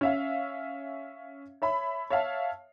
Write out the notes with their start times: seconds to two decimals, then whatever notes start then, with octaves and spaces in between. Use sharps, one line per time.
0.01 C#4 E5 F5
1.62 C#5 E5 B5
2.10 C#5 E5 F5 A5